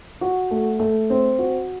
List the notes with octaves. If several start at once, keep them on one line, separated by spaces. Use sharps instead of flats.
F#4
A3
A3
C4
F#4